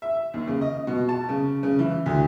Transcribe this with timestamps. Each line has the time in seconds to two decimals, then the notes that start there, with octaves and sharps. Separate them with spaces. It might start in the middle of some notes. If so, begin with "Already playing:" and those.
0.02 E5
0.34 D#2
0.48 C#3
0.61 D#5
0.87 B2
1.09 A5
1.29 C#3
1.63 C#3
1.79 E3
2.06 D2